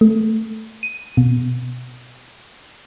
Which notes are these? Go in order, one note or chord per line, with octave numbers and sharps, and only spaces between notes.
A3
D#7
B2